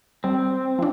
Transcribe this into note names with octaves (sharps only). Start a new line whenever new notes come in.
G3 C4
F3 D4